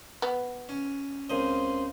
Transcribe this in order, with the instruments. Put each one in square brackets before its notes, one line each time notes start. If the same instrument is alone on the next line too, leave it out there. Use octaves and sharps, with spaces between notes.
[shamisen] B3
[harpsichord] C#4
[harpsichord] C#2 C#3 D#5 [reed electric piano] C4 A#4 C#5 [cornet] C5